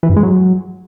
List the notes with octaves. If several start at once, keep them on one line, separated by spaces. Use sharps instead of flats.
E3
G2
G#3
F#3